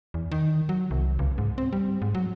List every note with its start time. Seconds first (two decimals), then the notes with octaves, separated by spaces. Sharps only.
0.14 E2
0.31 D#3
0.69 F#3
0.91 C2
1.19 C#2
1.38 G#2
1.58 C4
1.73 G3
2.02 G#2
2.15 F#3